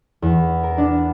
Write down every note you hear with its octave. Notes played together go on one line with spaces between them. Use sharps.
E2
A#4
D4